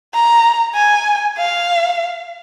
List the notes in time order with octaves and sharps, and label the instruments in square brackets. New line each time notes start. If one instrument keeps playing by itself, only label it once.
[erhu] A#5
G#5
F5